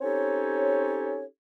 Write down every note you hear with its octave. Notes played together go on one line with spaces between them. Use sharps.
C4 C#4 D#4 G4 A4 C#5